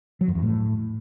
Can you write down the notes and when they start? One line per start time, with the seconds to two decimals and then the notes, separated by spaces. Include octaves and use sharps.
0.21 F#3
0.28 F2
0.35 E2
0.42 A2